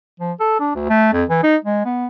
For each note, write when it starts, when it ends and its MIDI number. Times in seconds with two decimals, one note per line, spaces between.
0.20 0.32 53
0.40 0.57 69
0.60 0.72 62
0.75 0.85 38
0.89 1.09 57
1.13 1.24 41
1.29 1.40 52
1.43 1.56 63
1.64 1.85 56
1.85 2.07 59